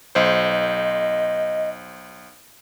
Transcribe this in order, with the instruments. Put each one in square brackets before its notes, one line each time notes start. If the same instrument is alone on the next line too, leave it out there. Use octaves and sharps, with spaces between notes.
[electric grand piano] B1 C5 [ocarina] D#5